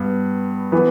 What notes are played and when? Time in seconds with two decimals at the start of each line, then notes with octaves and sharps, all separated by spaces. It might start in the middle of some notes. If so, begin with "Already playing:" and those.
Already playing: G2 B3
0.72 E3 B3